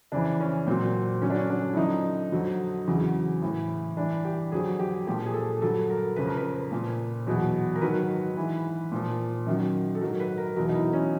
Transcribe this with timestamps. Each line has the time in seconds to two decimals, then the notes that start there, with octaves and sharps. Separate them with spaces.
0.12 F2 C#3 E3 D4
0.40 C#4
0.67 A#2 F#3 C4
1.22 G2 D3 F#3 C#4
1.30 D4
1.37 C#4
1.50 D4
1.73 E4
1.76 F#2 D3 F3 D#4
2.32 F2 D3 F#3
2.87 E2 C#3 F#3
3.42 A2 E3
3.97 G2 E3 D4
4.25 G4
4.52 F2 D3 F#3 G#4
4.79 G4
5.07 A#2 F3 G4
5.25 G#4
5.34 A4
5.62 G2 D3 F#3 A4
5.90 A#4
6.16 F2 C#3 F3 B4
6.27 A#4
6.37 B4
6.71 A#2 F3
7.27 E2 B2 F#3
7.76 A#4
7.81 G#2 D#3 F#3 B4
8.37 G#2 E3
8.92 A#2 F3
9.47 F#2 D#3 F#3
9.95 A4
10.01 G#2 D#3 F#3 A#4
10.20 B4
10.38 A#4
10.56 E2 B2 F#3 A#4
10.69 D#4
10.75 E4
10.93 C#4